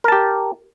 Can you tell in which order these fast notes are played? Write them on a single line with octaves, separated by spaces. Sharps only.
A#4 A5 G4